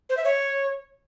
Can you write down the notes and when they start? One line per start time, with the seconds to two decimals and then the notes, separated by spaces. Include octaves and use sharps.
0.09 C5
0.17 E5
0.24 C#5